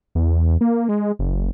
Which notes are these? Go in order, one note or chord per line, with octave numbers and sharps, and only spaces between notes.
E2
A#3
G#3
F#1